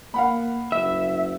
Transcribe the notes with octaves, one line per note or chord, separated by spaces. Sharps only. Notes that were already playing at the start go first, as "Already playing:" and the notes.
A#3 F5 F#5 B5
F#1 E5